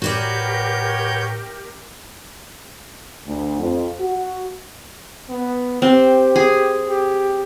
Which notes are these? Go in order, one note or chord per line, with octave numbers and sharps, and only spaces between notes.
A2 F#4 G4 A#4 B4 C#5 D5 G6
D2
F2
F#4
B3
C4 G4
G#4
G4